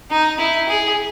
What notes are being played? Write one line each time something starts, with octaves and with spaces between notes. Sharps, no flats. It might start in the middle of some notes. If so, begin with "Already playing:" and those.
D#4
E4
G#4